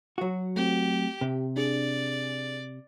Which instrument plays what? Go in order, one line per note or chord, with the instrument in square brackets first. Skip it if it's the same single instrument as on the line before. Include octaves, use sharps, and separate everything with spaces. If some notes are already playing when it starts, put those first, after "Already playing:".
[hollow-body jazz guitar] F#3 F#4
[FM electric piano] A3 C4 [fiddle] G4
[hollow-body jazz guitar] C3 [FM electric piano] G4
[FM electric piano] D4 G#4 [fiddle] D5